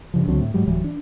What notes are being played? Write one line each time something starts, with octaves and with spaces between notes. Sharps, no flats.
G2 C#3 F3
C#2 D3 F#3 C4
A2
G#2 F#3 G3
D1 E3 F#3 G3
D4